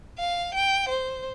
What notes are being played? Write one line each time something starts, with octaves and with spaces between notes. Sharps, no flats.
F5
G5
C5